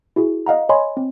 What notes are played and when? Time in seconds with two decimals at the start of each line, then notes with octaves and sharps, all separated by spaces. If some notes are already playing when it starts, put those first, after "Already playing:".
0.16 E4 F#4 G#4
0.46 D#5 F5 F#5 A#5
0.69 C#5 D#5 G#5 B5 C6
0.97 C4